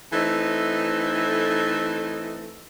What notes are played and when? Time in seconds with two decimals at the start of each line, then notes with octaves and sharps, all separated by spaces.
0.13 E3 A3 C4 D#4 A4